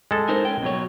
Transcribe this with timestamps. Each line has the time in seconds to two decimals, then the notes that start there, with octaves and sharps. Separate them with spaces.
0.11 G#3 A4
0.29 D#4 A#4 C5
0.45 C#4 G5
0.62 B2 F#3 C#5